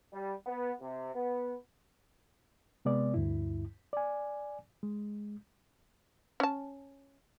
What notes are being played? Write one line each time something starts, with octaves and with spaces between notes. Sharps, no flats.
G3
B3
C3
B3
C3 G#3 B3 D5
D2 G2 E4
D5 G#5
G#3
C#4 A5